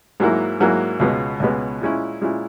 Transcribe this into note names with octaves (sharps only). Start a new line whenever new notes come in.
G#2 F#3 A#3 E4
G#2 F#3 A#3 E4
C#2 B2 G#3 B3
C#2 B2 G#3 B3
A#2 G#3 C#4 E4
A#2 G#3 C#4 E4